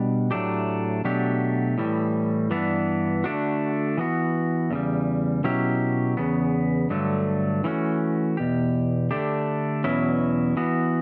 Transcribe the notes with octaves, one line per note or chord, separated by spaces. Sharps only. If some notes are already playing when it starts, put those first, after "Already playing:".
Already playing: B2 G3 D4
A2 F#3 A3 D4 G4
B2 F#3 A3 D4 G4
A2 E3 G3
G2 E3 B3 D4
D3 A3 D4 F#4
E3 B3 F#4
E2 C#3 G3
B2 F#3 C#4 E4 G4
E2 C#3 B3
G2 D3 F#3 A3
E3 A3 C#4 F#4
E2 B2 G4
D3 A3 D4 G4
E2 B2 F#3 C#4 E4
E3 B3 F#4